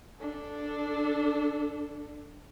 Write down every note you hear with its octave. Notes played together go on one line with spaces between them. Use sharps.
D4 A4